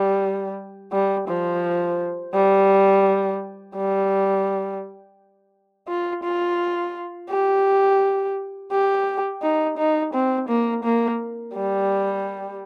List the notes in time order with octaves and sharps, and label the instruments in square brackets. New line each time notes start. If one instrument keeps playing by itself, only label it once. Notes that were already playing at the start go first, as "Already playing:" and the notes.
Already playing: [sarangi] G3
G3
F3
G3
G3
F4
F4
G4
G4
D#4
D#4
C4
A#3
A#3
G3